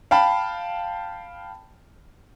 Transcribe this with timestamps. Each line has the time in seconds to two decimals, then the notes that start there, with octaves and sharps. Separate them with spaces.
0.11 F5 G5 A5 B5